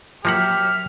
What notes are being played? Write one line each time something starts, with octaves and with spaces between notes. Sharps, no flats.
F3 F#3 A#3 G4 E5 F#5 F6